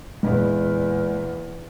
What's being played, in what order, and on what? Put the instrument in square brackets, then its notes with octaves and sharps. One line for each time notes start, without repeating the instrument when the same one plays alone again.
[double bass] E2 A#2 [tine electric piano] G#3